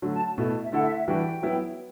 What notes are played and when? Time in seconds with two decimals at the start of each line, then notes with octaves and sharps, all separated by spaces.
0.02 D3 F#3 A3
0.14 A5
0.38 B2 A3 E4 A4
0.64 E5
0.72 D3 A3 E4 A4 F#5
0.84 E5
0.97 E5
1.07 E3 G3 D4 F#4 G5
1.43 F#3 B3 E4